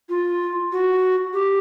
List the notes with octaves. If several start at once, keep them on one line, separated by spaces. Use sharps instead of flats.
F4
F#4
G4